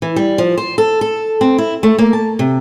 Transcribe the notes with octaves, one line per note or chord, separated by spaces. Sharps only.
E3
G3
F3
C5
A4
A4
C4
E4
A3
A#3
A5
C3